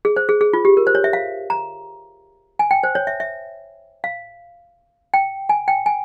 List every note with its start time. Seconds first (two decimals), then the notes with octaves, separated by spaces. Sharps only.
0.05 G#4
0.16 C5
0.29 G#4
0.41 G#4
0.53 F4
0.65 G4
0.77 A#4
0.87 C5
0.95 C#5
1.04 E5
1.13 F5
1.50 A#5
2.59 G#5
2.71 G5
2.83 C5
2.95 C#5
3.07 E5
3.20 E5
4.04 F5
5.14 G5
5.49 G#5
5.68 G5
5.86 G#5